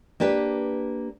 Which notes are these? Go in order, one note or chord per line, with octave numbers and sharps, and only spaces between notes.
A#3 D4 G4 B4